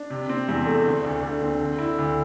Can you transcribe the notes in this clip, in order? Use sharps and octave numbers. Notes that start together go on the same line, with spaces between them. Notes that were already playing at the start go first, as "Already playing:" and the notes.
Already playing: D4
C3
C4
E2
A3
D3
D2
D2
C4
D3
E4
D2